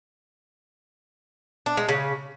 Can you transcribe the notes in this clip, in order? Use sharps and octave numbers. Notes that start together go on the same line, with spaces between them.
D4
G#3
C#3